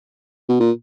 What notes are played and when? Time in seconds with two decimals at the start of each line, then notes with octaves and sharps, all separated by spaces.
0.49 B2
0.60 A#2